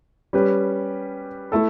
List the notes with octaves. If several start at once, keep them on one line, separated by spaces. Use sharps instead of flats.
G3 C#4 G4 B4
A3 E4 A4